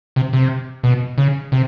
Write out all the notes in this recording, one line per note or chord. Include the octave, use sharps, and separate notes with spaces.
C3
C3
B2
C#3
C3